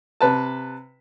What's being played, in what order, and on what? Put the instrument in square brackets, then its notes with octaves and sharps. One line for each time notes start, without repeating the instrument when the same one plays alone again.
[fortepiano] C3 B4 A5